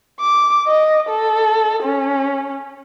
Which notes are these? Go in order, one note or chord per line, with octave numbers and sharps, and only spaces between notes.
D6
D#5
A4
C#4